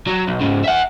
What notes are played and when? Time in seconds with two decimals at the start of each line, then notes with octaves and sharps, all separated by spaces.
0.07 F#3
0.28 B1
0.41 G#2 C#3
0.64 E5 F#5